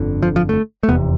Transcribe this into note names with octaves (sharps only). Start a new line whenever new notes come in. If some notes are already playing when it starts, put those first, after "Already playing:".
Already playing: G1 F2 D3
F3
F3
A3
A3
F1 E2 C3 B3